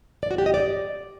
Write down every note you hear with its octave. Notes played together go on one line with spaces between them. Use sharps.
D5
F#4
G4
D#5
D5